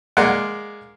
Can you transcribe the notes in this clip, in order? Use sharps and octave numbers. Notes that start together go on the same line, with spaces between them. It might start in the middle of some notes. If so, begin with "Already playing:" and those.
G#3 A#3 D5 F#5